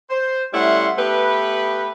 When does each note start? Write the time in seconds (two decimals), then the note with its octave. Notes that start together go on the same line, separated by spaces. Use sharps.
0.10 C5
0.53 G3 A3 C#4 E4 F#5 C6
0.98 A3 B3 G4 B4